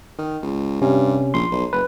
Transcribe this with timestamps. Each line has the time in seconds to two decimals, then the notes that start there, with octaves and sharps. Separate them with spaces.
0.18 D#3
0.43 C#2
0.81 G2 C3 C#4
1.34 A#1 C6
1.52 B1
1.73 F#1 B4